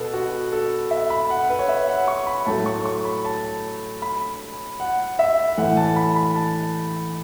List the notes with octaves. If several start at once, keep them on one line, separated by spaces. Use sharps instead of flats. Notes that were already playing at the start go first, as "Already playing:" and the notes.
Already playing: B2 B3 A4 B4 B5
F#4
A4
E5
B5
F#5
B4
C#5
E5
F#5
C#6
B5
A2 F#3 A3 A5
C#6
C#6
B5
A5
B5
F#5
E5
A2 E3 A3 F#5
A5
B5
B5
A5